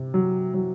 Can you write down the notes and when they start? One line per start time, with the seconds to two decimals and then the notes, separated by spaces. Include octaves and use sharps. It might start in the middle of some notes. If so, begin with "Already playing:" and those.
Already playing: C3
0.14 F#3
0.54 F#3